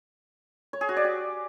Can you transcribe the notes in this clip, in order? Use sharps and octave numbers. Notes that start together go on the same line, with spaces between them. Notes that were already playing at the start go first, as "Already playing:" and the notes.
C#5
G#4
F#4
D5
G4